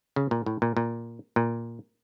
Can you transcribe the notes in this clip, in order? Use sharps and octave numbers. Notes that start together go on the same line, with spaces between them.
C#3
A#2
A2
A#2
A#2
A#2